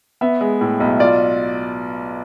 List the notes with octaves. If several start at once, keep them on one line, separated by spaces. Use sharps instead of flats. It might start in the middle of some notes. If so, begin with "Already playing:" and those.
B3 E5
G#3
A2
B1
F4 D5